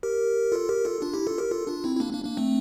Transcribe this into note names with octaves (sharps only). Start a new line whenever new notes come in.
G4 A#4
F4 A4
G4 A#4
F4 A4
D4 F4
E4 G4
F4 A4
G4 A#4
F4 A4
D4 F4
C4 E4
E4
A#3 D4
A#3 D4
A#3 D4
A3 C4